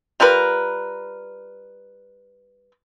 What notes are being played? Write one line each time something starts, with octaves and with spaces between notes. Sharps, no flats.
G3 F4 A#4 B4